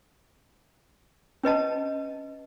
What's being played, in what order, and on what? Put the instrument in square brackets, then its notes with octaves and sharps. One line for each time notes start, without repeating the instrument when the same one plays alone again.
[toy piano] C#4 B4 D#5 A5